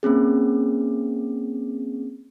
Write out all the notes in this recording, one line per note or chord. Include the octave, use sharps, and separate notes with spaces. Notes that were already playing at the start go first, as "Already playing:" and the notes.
A#3 C4 C#4 G#4